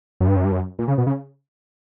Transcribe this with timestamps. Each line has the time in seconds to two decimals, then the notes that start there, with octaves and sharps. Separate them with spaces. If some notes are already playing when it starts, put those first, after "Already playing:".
0.20 F#2
0.28 G2
0.36 F#2
0.45 G2
0.52 F#2
0.79 A#2
0.88 C#3
0.98 B2
1.07 C#3